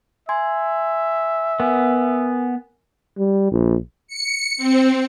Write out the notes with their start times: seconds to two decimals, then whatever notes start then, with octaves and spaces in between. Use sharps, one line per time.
0.29 E5 G#5 C6 G#6
1.60 B3 A#4 G#5
3.18 G3
3.52 A#1
4.07 C#7
4.57 C4